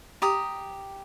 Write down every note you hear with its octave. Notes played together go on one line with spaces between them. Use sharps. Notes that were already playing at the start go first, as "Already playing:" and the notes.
G4 A#5 D#6